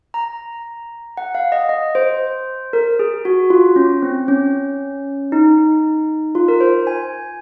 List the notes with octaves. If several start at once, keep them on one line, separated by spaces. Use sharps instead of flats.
A#5
F#5
F5
D#5
D#5
C5
A#4
G#4
F#4
F4
C#4
C4
C#4
D#4
F4
A#4
C5
G#5